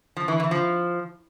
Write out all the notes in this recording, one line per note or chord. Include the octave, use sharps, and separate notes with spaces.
F3
E3
E3
F3